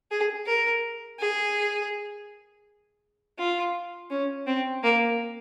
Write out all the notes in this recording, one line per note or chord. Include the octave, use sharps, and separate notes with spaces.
G#4
A#4
G#4
F4
C#4
C4
A#3